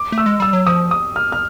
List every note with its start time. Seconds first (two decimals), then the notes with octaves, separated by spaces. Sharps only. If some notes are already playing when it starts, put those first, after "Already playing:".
Already playing: D6
0.12 A3
0.18 E6
0.26 G#3
0.40 G3 E6
0.53 F#3
0.66 F3 D#6
0.91 D#6
1.16 F6
1.32 F6